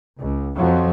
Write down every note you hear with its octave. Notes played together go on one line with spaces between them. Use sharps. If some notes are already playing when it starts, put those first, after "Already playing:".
C#2
F2 F3 F#3